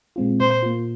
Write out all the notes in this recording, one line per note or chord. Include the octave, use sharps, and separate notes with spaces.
A#2 G#3 C4 F4
A#2 C5
A#3 F4